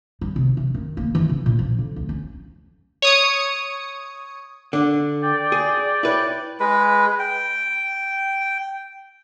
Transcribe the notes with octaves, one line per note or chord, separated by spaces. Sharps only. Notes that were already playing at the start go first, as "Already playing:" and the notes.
G3
C3
E3
D#3
A#3
E3
C#3
A#2
F3
D3
D2
C#4
C#5 D#6 C#7
D3 D4
D5 G5
G#4
E4 B4 C#5
G#3 B4
G5